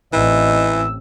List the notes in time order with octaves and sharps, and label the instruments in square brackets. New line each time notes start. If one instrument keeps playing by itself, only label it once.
[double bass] A1 C4 [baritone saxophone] E3 [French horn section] D#4 D5 D#5 [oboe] E6